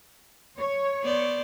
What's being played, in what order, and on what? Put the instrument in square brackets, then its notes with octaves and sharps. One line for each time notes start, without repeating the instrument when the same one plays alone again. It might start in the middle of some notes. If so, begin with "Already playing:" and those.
[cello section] C#5
[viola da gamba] B3 C5 D5